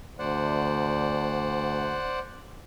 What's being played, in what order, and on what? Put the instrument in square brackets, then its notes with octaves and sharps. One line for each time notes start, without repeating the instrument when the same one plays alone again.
[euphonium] D2 [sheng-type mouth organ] C5 D5 F#5